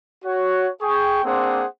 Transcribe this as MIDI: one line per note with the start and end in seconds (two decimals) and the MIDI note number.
0.25 0.69 66
0.25 0.69 73
0.81 1.21 68
0.81 1.21 79
0.81 1.21 85
1.24 1.64 58
1.24 1.64 60
1.24 1.64 62
1.24 1.64 68
1.24 1.64 72
1.24 1.64 78